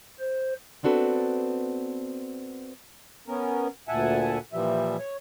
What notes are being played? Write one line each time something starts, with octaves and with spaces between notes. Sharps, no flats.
C5
B3 C4 D4 F#4 A4 B4
B3 C#4 A#4
D2 A#2 E5 F#5 G#5 A5
A#2 E3 F3 G3 E5
C#5